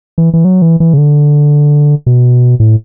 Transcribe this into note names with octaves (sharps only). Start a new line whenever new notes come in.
E3
E3
F#3
E3
E3
C#3
D3
B2
A2